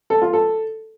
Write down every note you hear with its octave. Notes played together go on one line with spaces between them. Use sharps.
A4
F4
A4